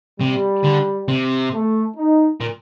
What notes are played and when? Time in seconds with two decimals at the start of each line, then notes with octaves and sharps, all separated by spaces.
0.20 C3 G3
0.64 D3
1.08 C3
1.53 A3
1.96 D#4
2.41 A#2